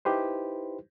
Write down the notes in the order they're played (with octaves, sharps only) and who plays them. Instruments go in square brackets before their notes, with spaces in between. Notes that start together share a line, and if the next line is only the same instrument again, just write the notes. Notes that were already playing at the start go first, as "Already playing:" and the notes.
[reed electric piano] D#4 E4 G4 B4 C5